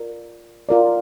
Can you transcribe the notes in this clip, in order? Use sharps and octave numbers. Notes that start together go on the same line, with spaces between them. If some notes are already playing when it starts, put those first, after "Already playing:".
Already playing: F4 A#4 D5
F4 A#4 D5